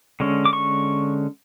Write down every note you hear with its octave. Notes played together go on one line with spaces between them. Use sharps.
D3 G#3 C#4
D6
C#6